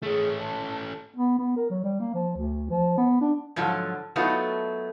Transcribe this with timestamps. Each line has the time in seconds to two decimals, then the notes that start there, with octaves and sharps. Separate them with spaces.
0.02 A3 C#4 G#4
0.40 A5
1.16 B3
1.39 B3
1.56 A#4
1.70 F#3
1.84 G3
2.00 A#3
2.14 F3
2.37 D2
2.70 F3
2.98 B3
3.21 D4
3.56 G#2 D3 F3 F#3
4.16 F#3 A3 B3 D#4 F4 F#4